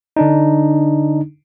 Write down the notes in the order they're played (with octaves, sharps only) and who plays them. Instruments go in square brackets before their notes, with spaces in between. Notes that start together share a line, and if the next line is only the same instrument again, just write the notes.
[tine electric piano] D3 D4 D#4